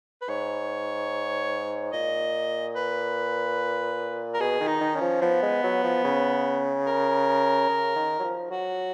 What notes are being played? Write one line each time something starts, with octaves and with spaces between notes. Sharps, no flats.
B4
G#2 C#5
A#2 D#5
B4
A#4
B2 G#4
D#3
D#4
D#3
C#4
F3
F3 B3
G#3
F#3
F3
C#3
A#4
C#3
D#3
F#3
F3
F#3 F#4